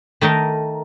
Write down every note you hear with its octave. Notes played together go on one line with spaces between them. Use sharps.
D#3 A3 D#4 A#4